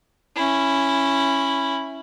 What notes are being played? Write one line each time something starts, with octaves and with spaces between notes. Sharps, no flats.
C#4 E4